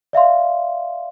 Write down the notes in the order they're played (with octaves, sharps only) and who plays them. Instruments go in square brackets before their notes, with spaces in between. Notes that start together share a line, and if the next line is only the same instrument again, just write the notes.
[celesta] D5 E5 F5 C6